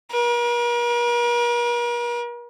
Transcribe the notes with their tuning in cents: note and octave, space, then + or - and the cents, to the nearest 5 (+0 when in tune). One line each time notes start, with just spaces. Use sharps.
A#4 +45